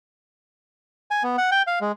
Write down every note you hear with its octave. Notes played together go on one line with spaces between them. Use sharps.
G#5
B3
F#5
G5
F5
G#3